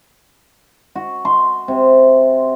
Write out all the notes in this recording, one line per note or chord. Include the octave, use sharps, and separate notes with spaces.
F#4
C6
C3